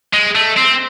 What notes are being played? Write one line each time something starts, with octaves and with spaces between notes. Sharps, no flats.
G#3
A3
C4